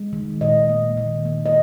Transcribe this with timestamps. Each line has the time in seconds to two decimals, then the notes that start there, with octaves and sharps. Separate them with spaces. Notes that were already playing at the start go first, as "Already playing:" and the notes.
Already playing: G#3
0.13 D#3
0.41 A#2 D#5
0.69 A#3
0.97 D#3
1.25 A#3
1.46 D#5